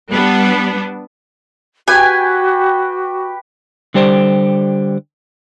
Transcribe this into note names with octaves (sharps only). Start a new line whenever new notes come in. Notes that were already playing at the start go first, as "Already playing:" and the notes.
G3 B3 D4
F#4 G4 B4 G5 G#5
D3 G3 G4 C5 D5